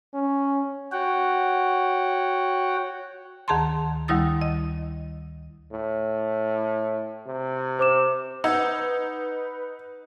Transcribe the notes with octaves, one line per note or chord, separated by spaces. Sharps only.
C#4
F#4 C#5 F#5 G5
D2 D#3 G#4 A5 A#5 C6
D2 D#3 G3 E4 D#6 A6
D#5
A2
C3
C5 D6 E7
D#4 B4 F#5 E6 G#6